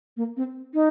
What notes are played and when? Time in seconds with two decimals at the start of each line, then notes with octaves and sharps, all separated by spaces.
0.17 A#3
0.37 C4
0.74 D#4